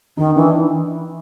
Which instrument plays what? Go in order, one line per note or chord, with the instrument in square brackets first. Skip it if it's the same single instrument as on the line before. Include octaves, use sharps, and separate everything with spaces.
[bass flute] D#3 [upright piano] D#4
[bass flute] E3 [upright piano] D4